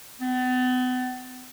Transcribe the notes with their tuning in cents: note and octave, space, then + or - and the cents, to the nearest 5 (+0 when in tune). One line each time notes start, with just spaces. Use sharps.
B3 +40